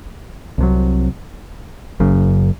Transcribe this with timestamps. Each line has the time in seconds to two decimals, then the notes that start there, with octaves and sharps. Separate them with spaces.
0.58 C2 C3 F#3
2.00 F#1 F#2 C#3